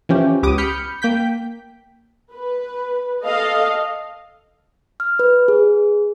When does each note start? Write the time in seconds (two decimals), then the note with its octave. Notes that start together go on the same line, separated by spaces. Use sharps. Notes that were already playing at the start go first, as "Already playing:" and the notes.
0.09 E3 F3 C#4 G4
0.43 C#2 B3 G4 D6 D#6 D#7
0.58 B5 F6 G6 C#7
1.02 A#3 G5 G6 B6
2.32 B4
3.24 A4 D#5 F5
5.00 F6
5.19 B4
5.48 G#4